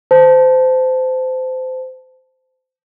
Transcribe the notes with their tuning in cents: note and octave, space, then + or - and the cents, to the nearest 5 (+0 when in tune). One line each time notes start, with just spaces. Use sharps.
C5 -25 A5 +0